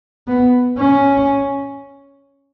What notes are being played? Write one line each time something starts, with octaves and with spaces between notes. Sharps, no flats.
B3
C#4